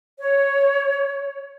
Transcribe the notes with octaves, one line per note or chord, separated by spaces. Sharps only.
C#5